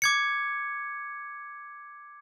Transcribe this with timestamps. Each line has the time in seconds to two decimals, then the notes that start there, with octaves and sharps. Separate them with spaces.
0.02 D6 G#6 C#7